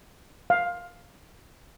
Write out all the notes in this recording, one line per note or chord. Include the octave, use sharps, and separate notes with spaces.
F5